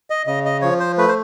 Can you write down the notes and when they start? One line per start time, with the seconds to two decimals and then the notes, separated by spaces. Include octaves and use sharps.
0.10 D#5
0.27 C#3 D#5
0.45 D#5
0.62 F3 C#5
0.80 C5
0.98 A3 B4
1.08 C5